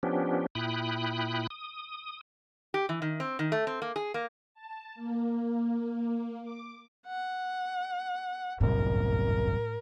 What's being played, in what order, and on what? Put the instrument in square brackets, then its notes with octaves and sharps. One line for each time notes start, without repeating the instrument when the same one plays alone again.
[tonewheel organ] F3 B3 C#4 D4 G4
A#2 E4 G5 B5 D#6 F#6
D#6
[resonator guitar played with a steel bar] G4
E3
D#3
C4
D#3
A3
C4
A#3
G#4
A#3
[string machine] A5
A#3
D6
[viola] F#5
[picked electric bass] G1 C2 F#2 [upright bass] A2 [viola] A#4